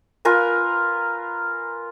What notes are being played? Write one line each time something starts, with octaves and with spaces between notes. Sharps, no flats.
F4 A#4 B4 G#5